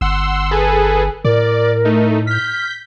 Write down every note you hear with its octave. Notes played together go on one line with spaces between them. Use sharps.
G1 F#5 C6 E6
G#4 A4 B4 G#5
A2 A#4 D5
A3 D#4
F6 G6 B6